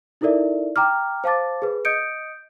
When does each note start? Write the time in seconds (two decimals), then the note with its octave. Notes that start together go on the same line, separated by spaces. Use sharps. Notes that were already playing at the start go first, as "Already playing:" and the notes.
0.21 D#4 E4 A4 A#4 D5 E5
0.76 G5 A#5 D6 F6
1.24 C5 F5 A5 D6 A6
1.62 G#4 B4
1.85 D#5 D#6 G6 C#7 D7